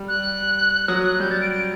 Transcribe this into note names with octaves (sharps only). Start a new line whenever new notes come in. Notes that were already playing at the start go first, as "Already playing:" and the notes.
Already playing: G3
F#6
F#6
F#3 D#6
F#6
F#6
G3 G6
A6
D7
D7